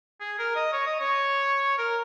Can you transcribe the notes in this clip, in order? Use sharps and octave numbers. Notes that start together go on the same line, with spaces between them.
G#4
A#4
D#5
C#5
D#5
C#5
A#4